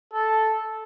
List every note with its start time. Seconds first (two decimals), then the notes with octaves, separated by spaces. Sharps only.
0.13 A4